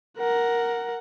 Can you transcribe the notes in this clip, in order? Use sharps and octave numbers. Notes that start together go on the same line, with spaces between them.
A#4 F#5